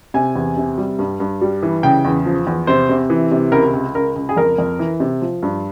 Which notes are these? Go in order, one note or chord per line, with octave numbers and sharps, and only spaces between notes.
C3 G#5
E2
C3
G3
G2
G2
G3
E3
C#3 G5
E2
F3
E2
C3 C5
C3
E3
C3
C#2 A#4
C#2
C#2 A#4
C#2
G#4
F2 A#4
F2
E3
C3
F3
G2